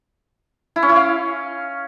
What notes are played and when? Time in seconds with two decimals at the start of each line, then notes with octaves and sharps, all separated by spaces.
0.76 E4
0.82 C#4
0.89 E4
0.96 F5